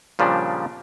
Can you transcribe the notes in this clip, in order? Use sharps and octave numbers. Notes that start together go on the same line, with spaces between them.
A#2 C#3 F3 G3 D4